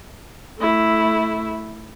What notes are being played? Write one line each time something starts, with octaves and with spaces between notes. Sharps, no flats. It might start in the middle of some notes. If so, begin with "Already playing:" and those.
A3 E4